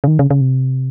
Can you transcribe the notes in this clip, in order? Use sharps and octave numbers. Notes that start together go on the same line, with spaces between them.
C#3
D#3
C#3
C#3
C3